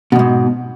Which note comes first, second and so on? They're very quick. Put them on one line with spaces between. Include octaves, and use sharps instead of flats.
B2 E2 G#2